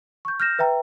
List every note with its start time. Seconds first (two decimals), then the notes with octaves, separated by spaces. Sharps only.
0.25 C#6 G6
0.40 F6 G6 A#6 E7
0.59 B4 E5 G5 A#5